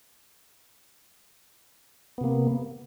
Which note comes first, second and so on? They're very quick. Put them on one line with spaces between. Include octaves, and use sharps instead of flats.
B3 C3 A#3